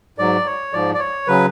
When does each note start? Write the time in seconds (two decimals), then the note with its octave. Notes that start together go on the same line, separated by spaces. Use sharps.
0.18 G#2 F#3 D5
0.46 C#5
0.73 G#2 F3 D5
0.94 D5
0.99 C#5
1.27 C#3 F#3 B4